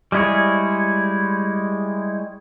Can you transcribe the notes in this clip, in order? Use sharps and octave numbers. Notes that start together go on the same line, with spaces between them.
G3 G#3 E4 G#4 C#5